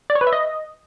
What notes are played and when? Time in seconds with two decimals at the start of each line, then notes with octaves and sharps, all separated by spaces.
0.10 D5
0.15 C#5
0.21 B4
0.27 E5
0.33 D#5